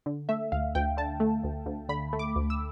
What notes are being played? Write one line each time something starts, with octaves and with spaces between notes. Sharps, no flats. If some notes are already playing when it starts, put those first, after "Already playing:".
D3
A3 E5
D2 F5
D2 G5
D3 A5
A3
D2
D2
D3 B5
A3
D6
D2
E6